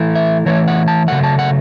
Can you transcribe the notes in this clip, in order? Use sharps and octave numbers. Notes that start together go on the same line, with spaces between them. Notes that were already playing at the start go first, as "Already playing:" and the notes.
Already playing: E3 A3 E4
E5
E3 A3 E4 C#5
F#5
A5
C#3 F#3 A3 F#5
A5
F#5